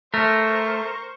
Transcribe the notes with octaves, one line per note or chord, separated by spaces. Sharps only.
A3 A#4 C5 C#6